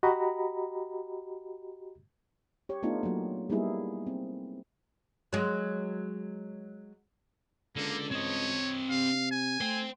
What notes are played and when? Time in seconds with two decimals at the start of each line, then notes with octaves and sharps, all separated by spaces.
0.03 F#4 G4 D#5 A#5 B5
2.69 G4 C#5
2.83 A3 B3 D4 D#4 F4
3.03 F#3 A#3
3.50 G3 A#3 B3 D#4 E4 G#4
4.07 C4
5.33 F#3 G#3
7.76 C#2 D3 A#3
8.11 C4 C#5 D#5
8.90 C3 F5
9.31 G#5
9.61 A3 C5 G5